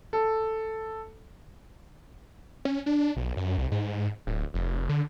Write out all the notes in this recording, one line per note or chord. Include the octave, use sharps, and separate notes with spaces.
A4
C#4
D4
B1
F#2
C2
G#2
D1
F1
D3